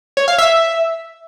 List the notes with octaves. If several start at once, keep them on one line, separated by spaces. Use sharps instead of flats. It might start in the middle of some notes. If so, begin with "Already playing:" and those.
C#5
F5
E5